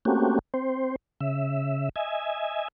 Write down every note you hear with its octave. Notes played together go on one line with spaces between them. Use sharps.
A3 A#3 C4 C#4 F#4 G4
C4 C5
C#3 E5
D#5 E5 G#5